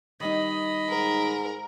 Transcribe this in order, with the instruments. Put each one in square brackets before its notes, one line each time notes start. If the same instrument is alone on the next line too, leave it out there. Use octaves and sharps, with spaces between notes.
[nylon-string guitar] D#3 G3 D#4 [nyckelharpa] D#5 B5
[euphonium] G#2 [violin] A#4